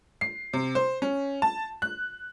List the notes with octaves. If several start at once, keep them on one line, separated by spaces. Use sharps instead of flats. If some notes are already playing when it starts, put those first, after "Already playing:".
C7
C3
C5
C#4
A5
F#6